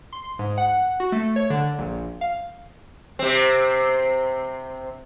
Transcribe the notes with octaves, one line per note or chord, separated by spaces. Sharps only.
C6
G#2
F#5
F#4
A3
C#5
D3
A#1
F5
C3 C4